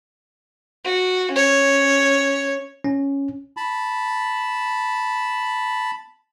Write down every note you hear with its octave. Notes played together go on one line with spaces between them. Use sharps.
F#4
C#4 C#5
C#4
A5 B5